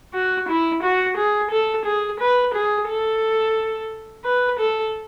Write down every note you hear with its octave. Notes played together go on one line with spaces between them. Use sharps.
F#4
E4
F#4
G#4
A4
G#4
B4
G#4
A4
B4
A4